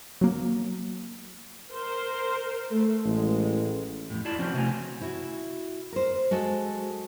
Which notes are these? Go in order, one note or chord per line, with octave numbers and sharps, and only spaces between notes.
F#3 A#3
A#4 C5
A3
A1 G#3
F2 A2
E4 F4 D5 A5
F3 C4 C#4 F#4 C5 D5
C3 A3 F#4 C5 G#5 A#5
E4 F#4
A#4 C5
G#3 F#4 A4